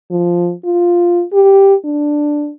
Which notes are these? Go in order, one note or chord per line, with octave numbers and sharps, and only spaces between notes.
F3
F4
G4
D4